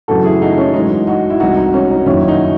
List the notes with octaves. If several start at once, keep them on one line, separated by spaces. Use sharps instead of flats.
F#2 C#3 E3 A3 F#4 A4
E4 G#4
D#4 F#4
C#4
F#2 E3 G#3 D#4
D#4 F#4
E4
C2 C3 E3 G#3 D#4 F#4
D#4
C#4
D#4
F#1 F#2 D#3 C#4 E4
D#4 F#4